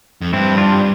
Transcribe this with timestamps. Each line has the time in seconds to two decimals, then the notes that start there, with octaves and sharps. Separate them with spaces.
0.21 F2
0.33 G2 C4 E4
0.57 D4 F4
0.73 G3